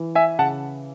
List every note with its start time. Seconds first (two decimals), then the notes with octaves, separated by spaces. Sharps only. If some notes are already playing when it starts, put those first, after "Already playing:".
Already playing: E3
0.15 E5 G#5
0.39 C#3 F#5 A5